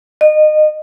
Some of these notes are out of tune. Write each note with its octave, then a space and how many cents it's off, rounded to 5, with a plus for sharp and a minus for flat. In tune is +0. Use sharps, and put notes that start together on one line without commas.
D#5 -25